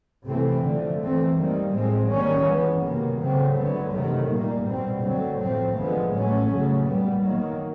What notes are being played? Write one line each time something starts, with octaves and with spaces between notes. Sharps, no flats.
C3 E3 A3 C4
D3 F3 A3
E3 A3 C4
D#3 G3 A#3
A2 F3 G#3 C4
D#3 G3 A#3 C#4
E3 G#3 B3
C3 D#3 F#3 A#3
C#3 F#3 A3 C4
D3 F#3 B3
C3 D#3 F#3 A3
A#2 G3 A#3
B2 G3 C4
D3 F#3 A3 C4
A2 F3 A3 C4
D3 F3 G#3 B3
A2 F#3 A3 C#4
C#3 F#3 A3
A#2 G3 B3
D#3 F#3 A#3